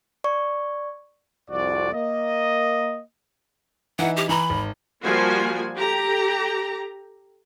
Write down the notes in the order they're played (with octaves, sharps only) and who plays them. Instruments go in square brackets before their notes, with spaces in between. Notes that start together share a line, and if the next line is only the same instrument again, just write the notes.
[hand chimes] D5 C#6
[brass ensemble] C2 F2 F3 F#4 D5
A#3 D#5
[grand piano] E3 D#4 E4 [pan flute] F#5
[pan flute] G4
[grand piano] E3 A#5 [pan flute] B5
[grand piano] G#1
[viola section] F3 G3 A#3 F4 F#4 G#5
G4 A4 A#5